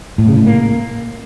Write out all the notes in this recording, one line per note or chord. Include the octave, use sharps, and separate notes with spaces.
A2
C#3
A2
A#3